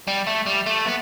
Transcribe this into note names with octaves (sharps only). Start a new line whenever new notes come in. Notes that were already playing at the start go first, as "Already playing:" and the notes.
G3
A3
G3
A3
B3